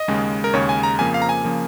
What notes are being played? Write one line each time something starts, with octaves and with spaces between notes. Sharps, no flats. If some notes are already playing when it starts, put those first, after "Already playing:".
Already playing: D#5
D#2 C#3 G#3
A#4
D#2 C#3 G#3 C#5
G#5
A#5
F2 C#3 F3 A#3 G#5
F5
A#5
G#5
C#3 F3 A#3